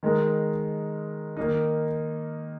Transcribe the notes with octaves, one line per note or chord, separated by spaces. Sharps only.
D#3 G#3 D#4 A#4
D#3 A#3 D#4